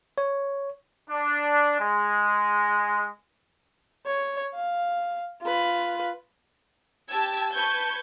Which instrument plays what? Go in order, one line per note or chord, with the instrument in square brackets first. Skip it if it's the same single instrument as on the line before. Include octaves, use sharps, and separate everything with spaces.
[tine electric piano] C#5
[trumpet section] D4
G#3
[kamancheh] C#5
F5
F4 B4
[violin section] G4 A5 E6 G#6
B4 A5 C#6 G6 G#6